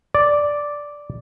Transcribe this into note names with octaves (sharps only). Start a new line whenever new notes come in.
D5